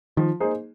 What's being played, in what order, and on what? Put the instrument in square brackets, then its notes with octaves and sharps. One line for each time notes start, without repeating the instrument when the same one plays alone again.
[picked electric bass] D#3 [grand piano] F3
[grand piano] A#3 D#4 G#4 C5